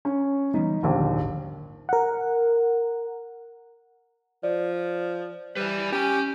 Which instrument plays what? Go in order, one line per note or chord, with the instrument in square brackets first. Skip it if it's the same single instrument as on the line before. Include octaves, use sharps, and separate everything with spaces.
[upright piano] C#4
[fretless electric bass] E3 G3 B3 [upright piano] D#4
[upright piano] A#1 D#2 [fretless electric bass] D3 F3
[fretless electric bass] G#1
[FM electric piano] A#4 F#5
[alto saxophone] F3 [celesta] D5
[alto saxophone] G3 [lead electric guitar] B4 E5
[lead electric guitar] C#4 G#5 [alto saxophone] G4